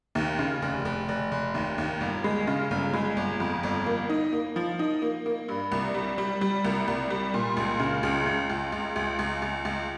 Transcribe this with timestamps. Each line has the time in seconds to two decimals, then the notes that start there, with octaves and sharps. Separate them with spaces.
0.15 D#2
0.39 C#3
0.62 F1
0.85 F1
1.09 F1
1.32 F1
1.54 D#2
1.78 D#2
2.01 G1
2.24 G#3
2.47 C#3
2.71 G1
2.94 G#3
3.17 G1
3.40 F2
3.63 G1
3.86 A#3
4.09 D#4
4.33 A#3
4.56 F3
4.79 D#4
5.02 A#3
5.26 A#3
5.49 G2
5.72 C2
5.94 G3
6.18 G3
6.41 G3
6.65 C2
6.88 C2
7.10 G3
7.34 A#2
7.57 C#2
7.79 C#3
8.03 C#2
8.26 C#2
8.50 C#2
8.72 C#2
8.96 C#2
9.19 C#2
9.42 C#2
9.65 C#2